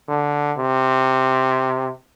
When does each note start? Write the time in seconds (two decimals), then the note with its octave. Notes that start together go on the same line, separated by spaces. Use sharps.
0.09 D3
0.58 C3